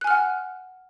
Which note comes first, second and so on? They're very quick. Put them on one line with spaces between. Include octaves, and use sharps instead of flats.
F#6 G#5 F6 F#5